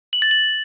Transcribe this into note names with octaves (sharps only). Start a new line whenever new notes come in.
F#7
A6
F#7